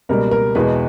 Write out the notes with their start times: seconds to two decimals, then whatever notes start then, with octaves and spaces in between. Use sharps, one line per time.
0.09 C#2 B2 G3 A#3 A#4
0.31 A#4
0.55 E2 B2 G#3 B4